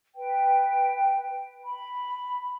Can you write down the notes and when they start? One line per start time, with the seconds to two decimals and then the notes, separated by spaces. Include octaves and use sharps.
0.15 B4 G5
1.64 B5